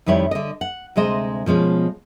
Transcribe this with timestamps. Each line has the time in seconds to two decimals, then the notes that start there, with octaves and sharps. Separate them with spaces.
0.06 F2 D#3 G3 E4 C#5
0.31 D3 D#5
0.61 F#5
0.96 D2 C3 G#3 C5 D#5
1.46 B2 F3 G#3 C#4